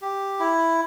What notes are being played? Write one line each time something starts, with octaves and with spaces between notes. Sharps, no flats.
G4
E4